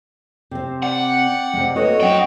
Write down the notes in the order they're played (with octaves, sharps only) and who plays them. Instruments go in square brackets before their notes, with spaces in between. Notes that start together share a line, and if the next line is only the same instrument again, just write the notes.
[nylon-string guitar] C3 C4
[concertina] D5 G5 [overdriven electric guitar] F#5
[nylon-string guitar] C3 G#3
[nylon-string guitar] A#3 A4 B4 [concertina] F#4 C#5 D#5
[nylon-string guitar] F#3 C4 F#5 [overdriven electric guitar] D4 G5